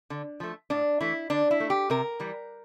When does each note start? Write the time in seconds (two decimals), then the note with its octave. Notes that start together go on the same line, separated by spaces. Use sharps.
0.10 D3
0.40 F3 A3
0.70 A2 D4
1.01 E3 A3 E4
1.30 D3 D4
1.51 E4
1.60 A3
1.70 G4
1.90 C3 A#4
2.20 E3 G3